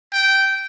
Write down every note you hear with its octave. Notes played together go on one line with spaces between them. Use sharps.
G5